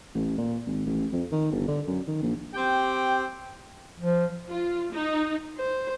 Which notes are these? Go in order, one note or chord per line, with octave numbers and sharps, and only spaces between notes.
A1
A#2
G#1
A1
F2
D#3
G1
D3
F#2
D#3
A#1
C4 G4 G5
F3
F4
D#4
C5